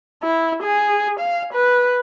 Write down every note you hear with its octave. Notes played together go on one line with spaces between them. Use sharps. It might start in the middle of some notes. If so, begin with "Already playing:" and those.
E4
G#4
F5
B4